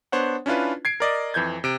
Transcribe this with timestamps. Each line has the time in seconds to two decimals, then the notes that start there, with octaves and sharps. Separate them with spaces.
0.12 B3 D4 C5 C#5 F#5
0.46 C#4 D4 E4 F4 B4
0.85 G#6 C7 D7
1.00 A#4 D5 D#5
1.34 F2 E3 G6 G#6
1.64 C3 D7